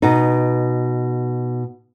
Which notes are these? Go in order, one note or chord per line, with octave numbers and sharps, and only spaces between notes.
B2 D#4